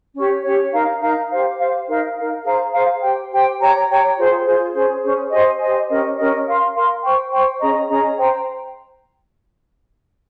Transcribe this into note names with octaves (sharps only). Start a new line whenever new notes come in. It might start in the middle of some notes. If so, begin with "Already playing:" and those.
C#4 G4 C#5
C#4 G4 C#5
D#4 A#4 F5 A#5
D#4 A#4 F5 A#5
G4 C5 F5
G4 C5 F5
D#4 A#4 F5
D#4 A#4 F5
G#4 C5 F5 A#5
G#4 C5 F5 A#5
G4 C5 G5
G4 C5 G5
G4 C#5 G5 A#5
G4 C#5 G5 A#5
F4 G#4 C5
F4 G#4 C5
C#4 G#4 C5
C#4 G#4 C5
G4 C5 D#5 G#5
G4 C5 D#5 G#5
C#4 G4 A#4 D#5
C#4 G4 A#4 D#5
A#4 F5 C6
A#4 F5 C6
C5 G5 C#6
C5 G5 C#6
C#4 G#4 D#5 A#5
C#4 G#4 D#5 A#5
C5 G5 A#5